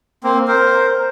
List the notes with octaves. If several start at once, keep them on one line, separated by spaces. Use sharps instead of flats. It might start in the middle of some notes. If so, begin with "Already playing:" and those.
A#3 C4
A#4 C5